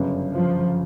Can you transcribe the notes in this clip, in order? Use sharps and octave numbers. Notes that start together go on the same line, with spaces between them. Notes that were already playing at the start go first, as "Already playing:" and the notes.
Already playing: G1 F#2 C#3
F3